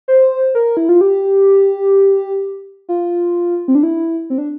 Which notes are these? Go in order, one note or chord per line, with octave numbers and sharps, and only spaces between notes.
C5
A#4
E4
F4
G4
F4
C4
D4
E4
C4
D4